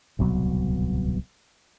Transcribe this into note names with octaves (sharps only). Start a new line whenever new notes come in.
D1 C2 B2 F#3